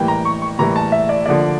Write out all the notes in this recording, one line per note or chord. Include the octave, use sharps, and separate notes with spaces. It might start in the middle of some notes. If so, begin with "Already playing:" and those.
Already playing: A2 E3 G3 A#3 G5
A#5
C#6
C#6
A2 E3 G3 A#3 A#5
A5
E5
D5
D3 F3 A#3 D5